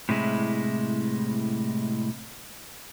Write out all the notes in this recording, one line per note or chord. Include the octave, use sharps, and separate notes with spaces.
A2 C3 G#3 E4